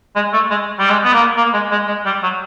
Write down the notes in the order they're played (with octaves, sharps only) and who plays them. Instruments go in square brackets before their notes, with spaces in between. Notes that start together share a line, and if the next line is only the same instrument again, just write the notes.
[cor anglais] G#3
A3
G#3
G3
G#3
B3
A#3
A#3
G#3
G#3
G#3
G3
F#3